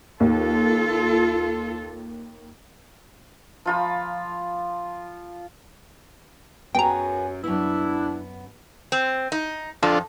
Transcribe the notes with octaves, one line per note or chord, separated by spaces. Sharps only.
D#2 F4 A4
F3 F4 B5
F#2 B3 F#4 G#4 G5 A#5
F#2 B3 D4 E4
C4
D#4
F2 D4 F4 A4